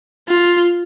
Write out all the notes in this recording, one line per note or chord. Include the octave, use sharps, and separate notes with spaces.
F4